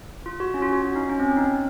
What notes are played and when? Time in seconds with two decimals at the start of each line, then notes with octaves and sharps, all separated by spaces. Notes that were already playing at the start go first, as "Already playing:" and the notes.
0.26 F4
0.40 F#4
0.54 C#4
0.62 F4
0.72 F#4
0.82 C#4
0.96 D#4
1.09 C#4
1.20 C4
1.29 C#4
1.37 D#4